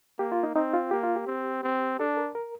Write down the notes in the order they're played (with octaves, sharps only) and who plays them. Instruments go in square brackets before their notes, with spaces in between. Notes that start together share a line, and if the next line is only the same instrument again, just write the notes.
[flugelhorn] A#3 [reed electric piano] G4
[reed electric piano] F4
D#4
[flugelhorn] C4 [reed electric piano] D#4
[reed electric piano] F4
[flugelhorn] A#3 [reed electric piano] G4
[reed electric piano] F4
G4
[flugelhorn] C4
C4
[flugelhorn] D4 [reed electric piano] A4
[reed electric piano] A#4
A#4